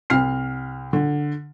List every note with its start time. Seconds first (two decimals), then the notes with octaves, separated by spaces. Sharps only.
0.10 C2 F6 C7
0.93 D3